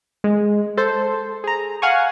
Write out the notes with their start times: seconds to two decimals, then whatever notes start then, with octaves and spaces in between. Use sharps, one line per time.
0.24 G#3
0.77 A4 C5
1.44 G#4 A#5
1.82 F5 F#5 G#5 C#6